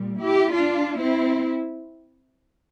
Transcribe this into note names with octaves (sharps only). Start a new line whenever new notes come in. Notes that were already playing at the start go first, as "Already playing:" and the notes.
Already playing: A#2 G3
E4 G4
D4 F4
C4 E4